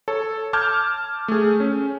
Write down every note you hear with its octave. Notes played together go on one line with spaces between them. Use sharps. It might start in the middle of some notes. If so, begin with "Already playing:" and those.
A4 C#5
A5 D6 F6 G6 G#6
A3 G#4
C#4